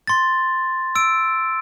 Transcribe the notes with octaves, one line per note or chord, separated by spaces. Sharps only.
C6 A6
E6 D7